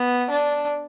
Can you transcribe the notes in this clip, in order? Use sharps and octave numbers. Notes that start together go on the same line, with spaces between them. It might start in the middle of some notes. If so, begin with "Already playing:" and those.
Already playing: B3
D4